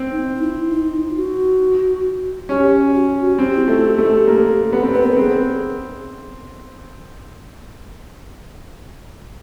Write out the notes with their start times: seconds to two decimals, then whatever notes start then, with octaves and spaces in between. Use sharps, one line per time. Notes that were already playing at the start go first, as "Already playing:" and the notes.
Already playing: C4
0.12 D#4
0.36 D#4
0.41 E4
0.70 D#4
1.10 F4
1.16 F#4
2.49 C#4 G4
2.94 F#4
3.27 F#4
3.39 C4 G4
3.56 E4
3.65 A3 F4
3.75 F#4
3.84 G4
3.98 A3
4.27 A#3
4.73 B3
4.84 C4
4.94 B3 B4
5.02 A#4
5.10 A4
5.17 C4 G#4